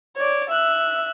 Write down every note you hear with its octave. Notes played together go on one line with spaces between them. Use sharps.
C#5 D5
E5 F#6